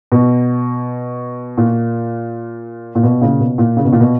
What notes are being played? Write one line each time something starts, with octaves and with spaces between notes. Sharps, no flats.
B2
A#2
A#2
B2
A#2 C#3
B2
A#2
C#3
B2
A#2
B2